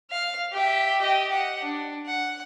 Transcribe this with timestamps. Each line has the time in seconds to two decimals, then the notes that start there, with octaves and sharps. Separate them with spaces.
0.11 F5
0.53 G4 E5
1.00 G4 D#5
1.31 F#5
1.62 D4
2.07 F#5